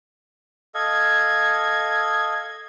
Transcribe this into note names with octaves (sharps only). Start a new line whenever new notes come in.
A4 D#5 F5 G#6